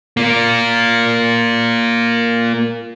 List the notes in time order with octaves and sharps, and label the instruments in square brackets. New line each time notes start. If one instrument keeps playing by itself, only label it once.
[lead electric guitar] A#3 F4